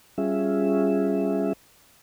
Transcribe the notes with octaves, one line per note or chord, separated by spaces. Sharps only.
G3 C#4 F4 G#4 E5